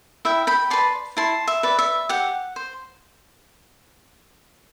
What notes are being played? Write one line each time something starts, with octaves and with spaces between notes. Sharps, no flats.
E4 E5 G5
G5 B5
B4 D5 A5 C6
E4 A5 C6
E5
B4 D5
E5
G4 F#5
C5